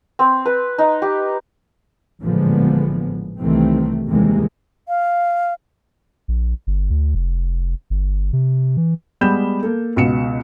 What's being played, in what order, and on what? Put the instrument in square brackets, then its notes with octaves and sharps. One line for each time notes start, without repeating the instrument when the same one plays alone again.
[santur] C4
B4
D#4
G4
[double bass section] A1 A#2 D3 F3 G#3 B3
C2 C3 D#3 E3 A3 C4
D#2 C3 E3 G3 G#3 A#3
[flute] F5
[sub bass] A#1
G1
D2
F1
G1
C3
E3
[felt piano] G3 G#3 B3 B5 G6 E7
A#3 A4
C#2 B2 B3 C#7 E7